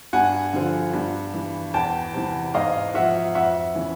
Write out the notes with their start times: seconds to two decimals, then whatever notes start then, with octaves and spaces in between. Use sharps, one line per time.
0.13 G2 F#5 G#5
0.53 D3 F3
0.93 G2
1.34 E3
1.74 E2 G5 A5
2.14 C3 E3
2.54 G#2 D#5 F5
2.94 F3 E5 F#5
3.35 F2 E5 F#5
3.75 C#3 E3